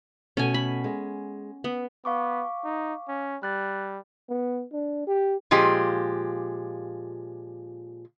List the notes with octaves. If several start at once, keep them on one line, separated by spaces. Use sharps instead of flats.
B2 A3 C#4 G#5
B5
G#3
B3
B3 F5 C#6 D6
D#4
C#4
G3 F#6 A6
B3
D4
G4
A#2 F3 G#3 G4